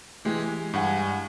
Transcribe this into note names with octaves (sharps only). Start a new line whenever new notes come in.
E3 G#3 G4
G2 F#5 G#5